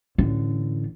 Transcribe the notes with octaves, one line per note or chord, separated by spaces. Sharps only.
A1 D3